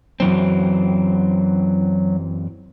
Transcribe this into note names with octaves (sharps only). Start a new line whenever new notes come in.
F#2 E3 F#3 C4